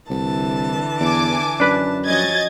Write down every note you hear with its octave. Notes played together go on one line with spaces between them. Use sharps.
C2 D3 E3 A5
E2 G#5 D6
F#2 D4 B4
F3 F#3 C#4 D#5 G#6 A6